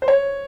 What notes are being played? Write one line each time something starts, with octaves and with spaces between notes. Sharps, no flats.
C5
C#5